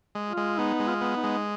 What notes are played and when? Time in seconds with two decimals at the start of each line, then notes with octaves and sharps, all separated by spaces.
0.15 G#3
0.29 F4
0.37 G#3
0.58 B3 D#4
0.80 G#3
0.87 F4
1.01 B3
1.16 D#4
1.24 G#3